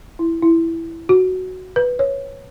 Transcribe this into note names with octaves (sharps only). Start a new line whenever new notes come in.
E4
E4
F#4
B4
C#5